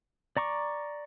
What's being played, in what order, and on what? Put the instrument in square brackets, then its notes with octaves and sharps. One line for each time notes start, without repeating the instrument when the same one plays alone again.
[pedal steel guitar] D5 A#5 C#6 D6